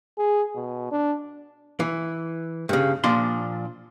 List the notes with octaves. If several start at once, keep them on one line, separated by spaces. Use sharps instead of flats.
G#4
B2
D4
E3
G2 C#3
A#2 F3 D4 C6